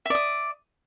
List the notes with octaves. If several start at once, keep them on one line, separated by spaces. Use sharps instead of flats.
D5 E5 D#6